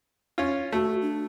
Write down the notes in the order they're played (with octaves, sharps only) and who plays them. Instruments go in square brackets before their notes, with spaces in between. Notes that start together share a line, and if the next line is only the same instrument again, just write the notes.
[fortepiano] C#4 F4
[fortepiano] A3 [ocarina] F#4
[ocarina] D4